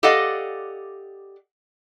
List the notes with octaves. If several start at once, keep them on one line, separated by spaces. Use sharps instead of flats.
G4 A4 D5 D#5 F5 F#5